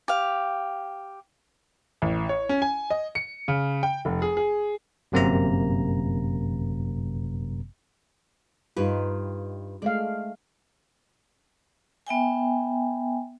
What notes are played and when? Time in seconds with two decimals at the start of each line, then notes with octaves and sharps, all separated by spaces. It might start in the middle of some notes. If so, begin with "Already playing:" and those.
0.08 G4 F5
2.02 A1
2.29 C#5
2.49 C#4
2.62 G#5
2.90 D#5
3.15 C#7
3.48 C#3
3.83 G5
4.05 F1
4.22 G#4
4.37 G#4
5.12 G1 F#2 C3 A#3 C4 A#5
8.77 G2 D#4 F4 G4 B4
9.82 G#3 A3 D5 F5
12.07 B3 E5 G5 G#5